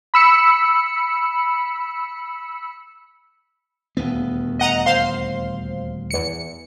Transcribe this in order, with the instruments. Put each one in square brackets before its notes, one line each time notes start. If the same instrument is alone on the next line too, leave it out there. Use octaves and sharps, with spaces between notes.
[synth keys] B5 E6 C#7
[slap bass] D#1 D2 B3
[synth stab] D#5 F#5 A#5
C5 F5 C6
E2 C#7